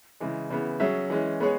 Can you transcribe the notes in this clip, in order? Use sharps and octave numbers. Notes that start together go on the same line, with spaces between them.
C#3 E3 G#3
C#3 E3 B3
F#3 C#4 G#4 E5
E3 G#3 C#4
G#3 B3 G#4 C#5